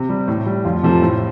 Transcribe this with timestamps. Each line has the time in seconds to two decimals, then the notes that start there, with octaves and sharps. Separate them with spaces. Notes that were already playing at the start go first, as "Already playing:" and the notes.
Already playing: C3
0.09 G3
0.28 A2
0.46 G3
0.65 F2 F4
0.83 C3 F3 A3
1.02 A2